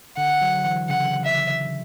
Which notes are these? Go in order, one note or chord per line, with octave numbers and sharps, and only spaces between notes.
D3 F#5
F#3
E3
C#3 F#5
E5